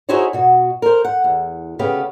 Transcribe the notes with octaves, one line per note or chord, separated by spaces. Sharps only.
D#4 E4 F#4 G#4 C5 C#5
B2 F#4
A#4 C5
F#5
E2
D2 C#3 B3 G4 G#4 F5